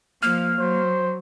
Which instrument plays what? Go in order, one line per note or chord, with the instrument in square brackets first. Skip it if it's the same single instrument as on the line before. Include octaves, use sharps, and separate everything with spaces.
[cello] F3 [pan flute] A#3 [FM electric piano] F6
[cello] F#3 [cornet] C5